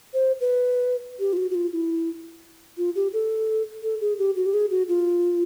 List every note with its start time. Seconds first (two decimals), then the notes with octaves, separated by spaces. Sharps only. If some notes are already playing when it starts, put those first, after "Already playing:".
0.14 C5
0.41 B4
1.20 G4
1.33 F4
1.37 F#4
1.51 F#4
1.55 F4
1.73 E4
2.78 F4
2.95 G4
3.13 A4
3.83 A4
4.01 G#4
4.19 G4
4.36 F#4
4.46 G4
4.54 G#4
4.71 F#4
4.88 F4